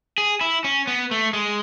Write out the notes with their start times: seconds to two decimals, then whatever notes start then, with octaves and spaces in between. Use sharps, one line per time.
0.18 G#4
0.41 E4
0.64 C#4
0.87 B3
1.11 A3
1.33 G#3